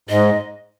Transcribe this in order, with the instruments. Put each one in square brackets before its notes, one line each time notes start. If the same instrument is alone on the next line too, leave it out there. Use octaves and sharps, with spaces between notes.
[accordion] G#2 [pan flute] D#5